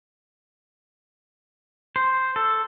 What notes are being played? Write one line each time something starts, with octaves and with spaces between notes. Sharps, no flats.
C5
A4